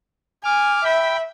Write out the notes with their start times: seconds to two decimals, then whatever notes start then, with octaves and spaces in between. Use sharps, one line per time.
0.44 G#5 D6 F6
0.85 E5 G5 B5